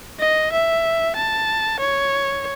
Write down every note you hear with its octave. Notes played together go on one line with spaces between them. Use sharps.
D#5
E5
A5
C#5